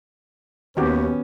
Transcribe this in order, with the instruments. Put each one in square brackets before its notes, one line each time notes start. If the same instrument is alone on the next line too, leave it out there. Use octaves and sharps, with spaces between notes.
[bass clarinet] D#2 [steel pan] D#3 F#4 G4 [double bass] B3 C#4